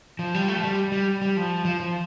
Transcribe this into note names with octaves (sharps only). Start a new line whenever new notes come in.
F3
G3
A3
F3
G3
G3
G3
F3
F3
F3